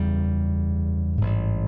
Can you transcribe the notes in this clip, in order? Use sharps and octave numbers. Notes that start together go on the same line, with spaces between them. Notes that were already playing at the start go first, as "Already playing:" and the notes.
Already playing: F#1 E2 C#3 G3
A1 G#2